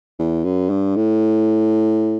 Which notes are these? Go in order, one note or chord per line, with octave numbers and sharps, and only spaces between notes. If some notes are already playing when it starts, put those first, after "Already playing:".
E2
F#2
G2
A2